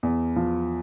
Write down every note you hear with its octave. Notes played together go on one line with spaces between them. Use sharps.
E2
F3